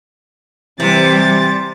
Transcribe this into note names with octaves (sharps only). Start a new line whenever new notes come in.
C3 E3 G3 C4 A6